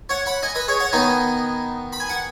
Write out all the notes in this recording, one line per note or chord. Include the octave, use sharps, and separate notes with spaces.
C#5 F#5
F#5 B5
D#5 G#5
B4 D#5
G#4 C#5
C#5 F#5
D#3 B3 D#4 D#5 G#5
B5
G#5
F#5